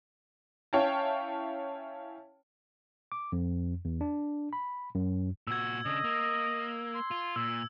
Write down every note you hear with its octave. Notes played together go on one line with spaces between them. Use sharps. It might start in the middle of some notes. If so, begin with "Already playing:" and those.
C#4 E4 C#5 F5 G5 A5
D6
F2
E2
D4
B5
F#2
A#2 F#4 E6 G#6
C#3 D4 D#5
A#3
C6
F4
A#2 E6